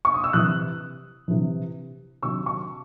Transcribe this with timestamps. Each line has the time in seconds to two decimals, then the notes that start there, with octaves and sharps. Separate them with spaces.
0.05 C#6
0.14 D#6
0.24 E6
0.33 C3 E3 D#6 F#6
1.28 C3 E3
2.23 C3 D#3 F#3 C#6 E6
2.46 A5 C#6